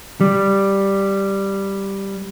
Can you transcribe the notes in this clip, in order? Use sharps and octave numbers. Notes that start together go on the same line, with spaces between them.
G3